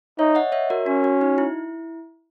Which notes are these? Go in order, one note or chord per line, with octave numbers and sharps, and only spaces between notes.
D#4 C#5 E5
D#5 F#5
C#5 E5
F#4 A#4
C#4 F#4
F#4
D#4
E4